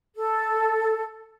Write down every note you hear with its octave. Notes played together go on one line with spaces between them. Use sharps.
A4